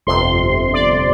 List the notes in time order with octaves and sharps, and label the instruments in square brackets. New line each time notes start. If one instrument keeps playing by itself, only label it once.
[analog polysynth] G1 F2 C3 C6
D5